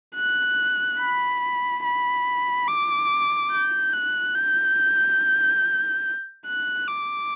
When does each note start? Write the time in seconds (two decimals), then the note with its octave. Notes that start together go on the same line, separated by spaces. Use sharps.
0.15 F#6
0.99 B5
1.84 B5
2.68 D6
3.51 G6
3.93 F#6
4.35 G6
6.46 F#6
6.88 D6